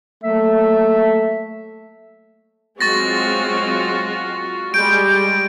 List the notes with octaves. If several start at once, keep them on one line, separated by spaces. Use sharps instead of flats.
F#3 A3 A#3 E5
F#3 G#3 C4 F4 F#4 C#6 A6 A#6
G3 G#3 G6 D7